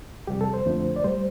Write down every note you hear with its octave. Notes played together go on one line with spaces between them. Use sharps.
F2 C3 G3 G4
A4
C5
F2 D3 F3 A3
D5
A2 G3 C5